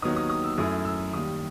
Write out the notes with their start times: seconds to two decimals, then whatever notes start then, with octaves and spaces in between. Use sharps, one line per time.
0.02 D#2 D#3 F#3 B3 D#4 D#6
0.17 D#6
0.30 D#6
0.44 E6
0.58 F#2 F#3 A3 E4 D#6
0.85 E6
1.13 D#2 D#3 G3 D#6